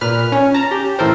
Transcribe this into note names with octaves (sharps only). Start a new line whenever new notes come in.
A#2 B4 F6
C#4
A5 A#5
G4
A2 E3 A4 A#4 C5